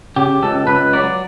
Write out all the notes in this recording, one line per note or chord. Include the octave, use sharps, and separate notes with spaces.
C#3 G4
C#2 A4
C#2 B4
F#3 D5